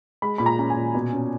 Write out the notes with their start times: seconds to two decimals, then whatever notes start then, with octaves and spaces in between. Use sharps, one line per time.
0.22 G#3 B5
0.38 A#2 B5
0.46 A#5
0.59 C#4 A#5
0.70 G#5
0.76 A#2
0.95 B2
1.13 C#4